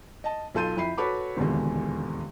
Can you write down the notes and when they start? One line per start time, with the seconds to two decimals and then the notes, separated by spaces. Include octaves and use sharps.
0.24 D#5 A5
0.55 B1 F4 A4 C6 G6 D#7
0.77 F2 E4 B5 C7
0.98 F#4 A4 B4 C#5 B5 D6
1.37 D#1 G#1 E2 B2 D3 G#3